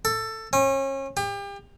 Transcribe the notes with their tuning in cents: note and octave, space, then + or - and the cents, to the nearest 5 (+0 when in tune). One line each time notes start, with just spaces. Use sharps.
A4 +15
C#4 -35
G4 +35